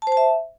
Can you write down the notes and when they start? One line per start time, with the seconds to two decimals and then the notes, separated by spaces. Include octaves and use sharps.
0.02 A5
0.07 C5
0.12 A5
0.17 E5